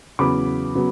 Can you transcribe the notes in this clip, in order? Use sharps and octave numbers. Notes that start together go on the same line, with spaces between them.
E2 C#3 F#3 B3 B5 D6
C#3 F#3 B3